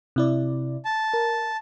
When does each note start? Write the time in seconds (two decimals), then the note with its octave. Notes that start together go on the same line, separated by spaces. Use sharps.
0.16 C3 E4 D5
0.85 A5
1.14 A#4